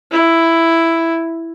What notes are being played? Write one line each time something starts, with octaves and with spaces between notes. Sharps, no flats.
E4